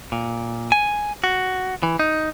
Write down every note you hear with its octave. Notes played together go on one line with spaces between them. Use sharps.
A#2
G#5
F#4
E3
D#4